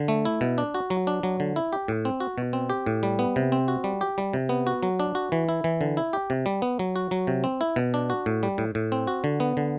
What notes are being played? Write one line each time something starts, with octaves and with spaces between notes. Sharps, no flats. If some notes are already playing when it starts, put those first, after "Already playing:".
Already playing: D3
A3
E4
B2
D4
F#4
F#3
D4
F#3
D3
E4
G4
A2
C4
F#4
B2
C4
G4
A2
G3
B3
C3
C4
F#4
G3
G4
G3
C3
B3
F#4
F#3
D4
F#4
E3
E4
E3
D3
E4
G4
C3
G3
B3
F#3
F#4
F#3
C3
C4
E4
B2
D4
F#4
A2
G3
A2
A2
C4
F#4
D3
B3
D3